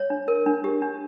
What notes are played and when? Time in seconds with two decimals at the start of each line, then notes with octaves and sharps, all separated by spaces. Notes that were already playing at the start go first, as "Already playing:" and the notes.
Already playing: C#5
0.10 D4
0.28 A#4
0.46 D4
0.64 G4
0.82 D4